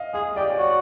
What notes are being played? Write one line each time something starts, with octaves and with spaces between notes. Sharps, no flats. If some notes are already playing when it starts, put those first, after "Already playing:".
Already playing: D#5 F5
G#4 F5
G4 D5
C#5
F#4 D5